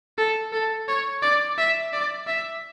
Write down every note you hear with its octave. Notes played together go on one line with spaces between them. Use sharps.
A4
A4
C#5
D5
E5
D5
E5